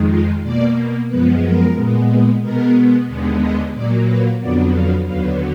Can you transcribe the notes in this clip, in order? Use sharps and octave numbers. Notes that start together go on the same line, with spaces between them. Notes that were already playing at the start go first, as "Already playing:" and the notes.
Already playing: F2 D#3 G#3
F4
B2 A#3 D5
F#2 F3 G#3 B3 B4
A#4
A#2 G#3 B3
B2 G#3 B3 A#4
D#2 D3 G#3 B3
D#5
A#2 F#3 A#3 D5
B4
F2 D3 F#3 B3 D5
F5
D#2 D3 F#3 B3 F5